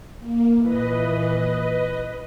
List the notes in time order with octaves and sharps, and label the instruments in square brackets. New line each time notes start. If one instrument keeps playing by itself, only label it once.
[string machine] A#3
[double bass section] A#2 E3 [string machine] B4 D#5